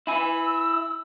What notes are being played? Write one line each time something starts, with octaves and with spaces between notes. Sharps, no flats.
E4 G#5 E6